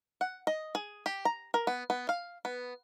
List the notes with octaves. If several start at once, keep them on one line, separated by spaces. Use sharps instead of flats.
F#5
D#5
G#4
G4
A#5
A#4
B3
B3
F5
B3